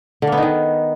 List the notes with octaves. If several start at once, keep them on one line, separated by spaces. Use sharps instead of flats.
D3
A#3
B3
D#4
D#3